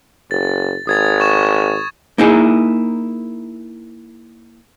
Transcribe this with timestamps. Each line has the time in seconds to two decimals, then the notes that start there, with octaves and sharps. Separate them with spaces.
0.31 F#1 A6
0.87 G#1 D#6 G#6 A6
1.20 C#6 E7
2.18 A#3 D#4 E4 G#4